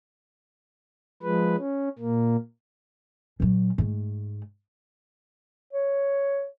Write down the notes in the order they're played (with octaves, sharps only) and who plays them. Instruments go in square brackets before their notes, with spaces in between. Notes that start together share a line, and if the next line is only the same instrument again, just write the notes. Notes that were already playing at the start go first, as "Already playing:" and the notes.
[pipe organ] F3 G#3 B4
C#4
A#2 A#3
[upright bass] A#2 F#3
G#2 A3
[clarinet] C#5